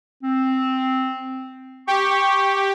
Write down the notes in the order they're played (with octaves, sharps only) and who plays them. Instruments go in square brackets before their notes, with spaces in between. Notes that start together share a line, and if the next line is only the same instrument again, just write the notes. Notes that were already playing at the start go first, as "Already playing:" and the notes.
[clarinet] C4
[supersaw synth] G4 [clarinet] C#6